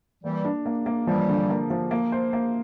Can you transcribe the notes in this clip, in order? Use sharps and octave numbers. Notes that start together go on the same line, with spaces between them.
E3 G3 A#3
D4
A#3
A#3
E3 F3 G3
D3
A#3
F3
A#3
C5
A#3